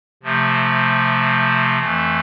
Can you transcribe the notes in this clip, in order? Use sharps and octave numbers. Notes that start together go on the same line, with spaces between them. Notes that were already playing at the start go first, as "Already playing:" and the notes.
C3 F3 A3
F2 E3 A3